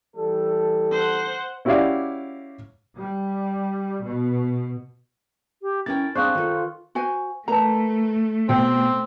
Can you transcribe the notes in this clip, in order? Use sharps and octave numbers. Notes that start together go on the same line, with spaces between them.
E3 G3 A4
C5 F#5
C#4 E4 F#4 G4 D5 F5
G3
B2
G4
C#4 E4 A#4 G5 A6
C4 D4 G#4 C5 F5 C#6 F#6
D#3 F4 A4
F#4 C5 G#5
A3 A#4 B4 A5 A#5
B2 C4 G5